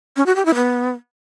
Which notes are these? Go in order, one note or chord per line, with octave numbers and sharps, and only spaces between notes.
C#4
F#4
G4
E4
B3